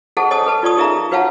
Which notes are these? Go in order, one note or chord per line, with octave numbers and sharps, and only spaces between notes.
G#4 A4 C5 D#5 F#5 A5
C#5 D#5 G#5 A5 D#6
A4 B4 A5
F4 D5 A5 C#6 D#6
D#4 G#4 A#4 E5 F5 A#5
F#4 B4 C#5 F5 F#5 A5